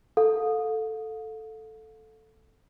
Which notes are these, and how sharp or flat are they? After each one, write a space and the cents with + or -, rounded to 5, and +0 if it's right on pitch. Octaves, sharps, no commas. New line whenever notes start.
A4 +0 F5 +35